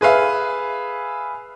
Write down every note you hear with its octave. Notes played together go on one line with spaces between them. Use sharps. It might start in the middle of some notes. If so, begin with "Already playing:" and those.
G#4 B4 E5 F5